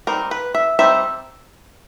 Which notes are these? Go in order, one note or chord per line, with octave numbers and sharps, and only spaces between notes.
G3 C4 D#4 A#4
B4
E5
G3 C4 D#4 E5